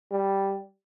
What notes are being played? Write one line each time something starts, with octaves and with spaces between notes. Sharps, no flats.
G3